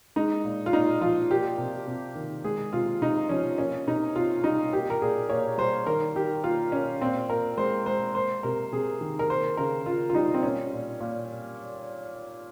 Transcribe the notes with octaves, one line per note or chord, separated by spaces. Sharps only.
G#3 D#4
A#2
F4
A#2 D#4
F3 F4
A#3 G4
C3
C3
D#3
G#3 G#4
C3 F4
C3 D#4
F3 C#4
A#3 C#4
C3 D#4
C3 F4
G3 D#4
A#3 G4
A#4
A#2 G#4
A#2 C#5
G3 C5
D#3 A#4
D#3 G4
A#3 F4
A#3 C#4
A#2 C4
A#2 A#4
G#3 C5
G#3 C5
A#3 C5
C3 A#4
C3 G#4
D#3
A#4
A#3 C5
C#3 A#4
C#3 F4
F4
G3 D#4
C4
A#3 C#4
A#2
A#2